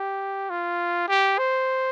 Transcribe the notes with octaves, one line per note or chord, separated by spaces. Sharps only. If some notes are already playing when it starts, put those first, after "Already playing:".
Already playing: G4
F4
G4
C5